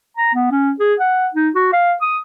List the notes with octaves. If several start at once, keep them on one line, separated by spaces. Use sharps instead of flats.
A#5
B3
C#4
G#4
F#5
D#4
F#4
F5
D#6